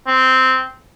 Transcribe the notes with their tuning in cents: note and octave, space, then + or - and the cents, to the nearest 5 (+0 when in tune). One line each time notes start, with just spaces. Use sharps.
C4 -10